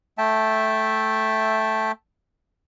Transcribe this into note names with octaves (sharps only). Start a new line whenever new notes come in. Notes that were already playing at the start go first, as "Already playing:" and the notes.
A3 E5 G5 A5